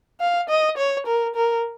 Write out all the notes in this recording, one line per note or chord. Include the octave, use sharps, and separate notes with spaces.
F5
D#5
C#5
A#4
A#4